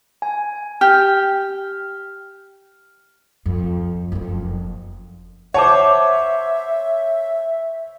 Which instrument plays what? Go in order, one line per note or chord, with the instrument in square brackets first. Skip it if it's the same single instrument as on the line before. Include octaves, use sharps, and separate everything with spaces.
[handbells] G#5
[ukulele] G4 [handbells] F6
[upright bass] F2
F#1 F2
[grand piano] C5 C#5 [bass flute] E5 [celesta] F#5 A5 D6